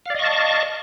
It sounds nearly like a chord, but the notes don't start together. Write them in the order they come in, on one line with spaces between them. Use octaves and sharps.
F5 D5 D#5 C#6 A5